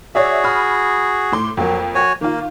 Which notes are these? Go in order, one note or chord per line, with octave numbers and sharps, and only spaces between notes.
F#4 G#4 C#5 D5 E5
B5 D#6 F6
A2 C6 D6
F2 F#3 A#3
F#4 C#5 G#5
D#3 A#3 F4